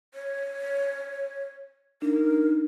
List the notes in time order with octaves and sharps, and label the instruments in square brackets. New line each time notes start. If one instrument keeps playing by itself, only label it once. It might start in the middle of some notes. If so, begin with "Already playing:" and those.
[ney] C#5
[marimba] D4 [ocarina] D#4 [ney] A#4